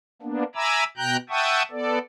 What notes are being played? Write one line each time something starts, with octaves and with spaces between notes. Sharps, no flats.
A#3 B3 D4
E5 G#5 A#5 B5 D6 E6
B2 G5 A#5 F#6 G6
E5 F#5 G5 A5 C#6 D#6
B3 A4 D5